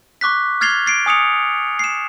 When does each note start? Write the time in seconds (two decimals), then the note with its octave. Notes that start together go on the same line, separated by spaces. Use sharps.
0.21 C#6 D6 F#6 B6
0.61 F6 G#6 A6 C7 F7 G7
0.86 A6 C7 D7
1.06 G#5 D#6 C#7 F7
1.79 C7 E7